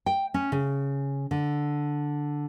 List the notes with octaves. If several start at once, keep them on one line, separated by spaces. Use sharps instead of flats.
G5
C#4
C#3
D3